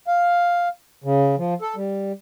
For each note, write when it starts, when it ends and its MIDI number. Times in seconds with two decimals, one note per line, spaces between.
0.07 0.69 77
1.04 1.35 49
1.38 1.54 53
1.61 1.75 69
1.76 2.12 55